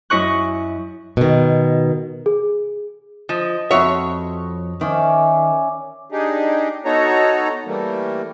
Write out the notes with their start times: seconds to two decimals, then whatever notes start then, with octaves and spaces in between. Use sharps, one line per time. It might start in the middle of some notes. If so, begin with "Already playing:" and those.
0.10 F#2 E4 D#5 C#6 F#6
1.17 B2 D#3
2.26 G#4
3.29 F3 D#5
3.71 F2 F#4 C#5 E5
4.81 D#3 C#4 D5 E5
6.12 D4 D#4 G4 G#4
6.85 B3 D#4 F#4 A4 C#5 A#5
7.66 E3 G3 A3 A#3